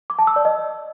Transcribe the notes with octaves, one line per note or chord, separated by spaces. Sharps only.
D6
A5
E6
D5
D#5